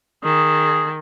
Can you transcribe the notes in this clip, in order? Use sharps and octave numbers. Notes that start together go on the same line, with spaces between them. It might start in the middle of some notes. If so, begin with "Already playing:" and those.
D#3 G#4